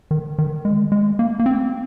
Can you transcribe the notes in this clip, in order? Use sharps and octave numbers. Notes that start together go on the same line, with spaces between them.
D#3
D#3
G#3
G#3
A#3
A#3
C4